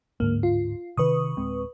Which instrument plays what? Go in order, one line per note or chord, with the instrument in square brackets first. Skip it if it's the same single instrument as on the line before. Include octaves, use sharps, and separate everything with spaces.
[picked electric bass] D1 G#2 D3 [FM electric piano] A#3
[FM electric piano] F4
[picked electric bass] C3 D#3 [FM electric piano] B4 C#6 D#6
[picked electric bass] D1 G#3 C4